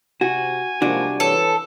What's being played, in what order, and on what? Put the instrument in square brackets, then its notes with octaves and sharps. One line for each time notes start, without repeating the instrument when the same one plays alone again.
[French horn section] C3 [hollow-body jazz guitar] F#4 [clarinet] G#5
[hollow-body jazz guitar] C2 D4 F#4 [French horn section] F3 G#3 A#3
[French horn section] E3 B4 C#5 [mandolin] A4